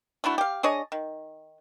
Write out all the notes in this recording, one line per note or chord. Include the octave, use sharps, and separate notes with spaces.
A3 D4 E4 F#4
G4 F5
D4 G#4 C#5 D#5
D#3